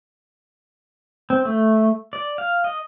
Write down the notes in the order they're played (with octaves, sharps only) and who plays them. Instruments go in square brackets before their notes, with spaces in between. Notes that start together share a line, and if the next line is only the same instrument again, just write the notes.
[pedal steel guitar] C4
A3
D5
F5
D#5